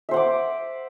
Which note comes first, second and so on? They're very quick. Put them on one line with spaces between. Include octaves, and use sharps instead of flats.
E5 C5 F#5 D6